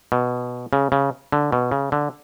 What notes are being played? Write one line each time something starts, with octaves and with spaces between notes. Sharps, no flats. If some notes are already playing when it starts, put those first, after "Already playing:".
B2
C#3
C#3
D3
B2
C#3
D3